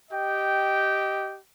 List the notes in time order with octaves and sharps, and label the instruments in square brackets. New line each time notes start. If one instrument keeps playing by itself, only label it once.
[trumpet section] G4 D#5 G5